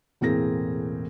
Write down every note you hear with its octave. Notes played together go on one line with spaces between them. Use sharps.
E1 A2 A#3 C4 G#4 A#6